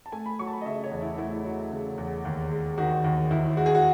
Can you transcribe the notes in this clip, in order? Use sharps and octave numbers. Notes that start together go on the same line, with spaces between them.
A5
A3 G#5
B5
F#3 C#6
A5
B5
D#5
C#3 E5
C#5
E2
E4
A3 E4
F#3
C#3
E2
D#2
G#3
D#3 F#4
D#2
D#2 E4
G#3 F#4
G#4
F#4